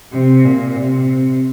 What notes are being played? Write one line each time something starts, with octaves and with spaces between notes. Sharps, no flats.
C3
A#2
C3